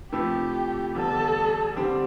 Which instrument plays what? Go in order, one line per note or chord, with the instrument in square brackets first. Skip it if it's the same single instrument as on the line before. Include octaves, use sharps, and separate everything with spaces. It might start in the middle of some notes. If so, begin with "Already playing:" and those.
[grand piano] C3 F3 A3 E4 [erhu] G4
[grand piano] E2 D3 G3 [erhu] A4
[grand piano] D3 G3 C4 G4